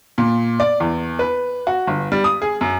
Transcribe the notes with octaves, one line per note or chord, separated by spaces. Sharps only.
A#2
D5
E2
B4
F#4
G1
G3
D#6
G#4
F#2